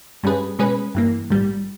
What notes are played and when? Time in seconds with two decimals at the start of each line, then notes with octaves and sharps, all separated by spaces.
0.23 G2 G3 C#4 G#4 B4
0.59 B2 G#3 C#4 G#4 B4
0.95 G2 E3 A#3
1.30 A#1 G#2 G3